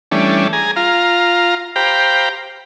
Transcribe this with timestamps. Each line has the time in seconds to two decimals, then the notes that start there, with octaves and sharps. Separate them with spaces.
0.12 E3 G3 A3 C#4 D4
0.53 G#4 G#5 A#5
0.76 F4 F5 A#5
1.76 G4 C5 F5 G5 A#5 B5